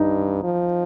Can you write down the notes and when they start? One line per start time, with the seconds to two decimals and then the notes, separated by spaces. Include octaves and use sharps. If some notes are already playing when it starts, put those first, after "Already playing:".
Already playing: G2 D#4
0.43 F3